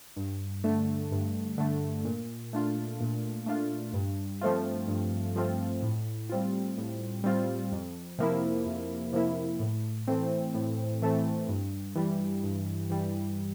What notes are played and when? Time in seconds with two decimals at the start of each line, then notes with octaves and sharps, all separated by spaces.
0.16 G2
0.64 D3 A3
1.12 G2
1.58 D3 A3
2.05 A#2
2.53 A3 D4 F4
3.00 A#2
3.46 A3 D4 F4
3.93 G2
4.41 F3 A3 C4 F4
4.88 G2
5.36 F3 A3 C4 F4
5.82 A2
6.29 G3 C4 F4
6.78 A2
7.24 G3 C4 F4
7.72 F2
8.18 C3 F3 A#3 E4
8.66 F2
9.13 C3 F3 A#3 E4
9.60 A2
10.08 E3 A3 C4
10.54 A2
11.02 E3 A3 C4
11.49 G2
11.95 E3 G3
12.44 G2
12.90 E3 G3